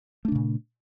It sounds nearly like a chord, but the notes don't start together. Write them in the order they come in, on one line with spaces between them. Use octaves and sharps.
A3 D4 C#3 A#2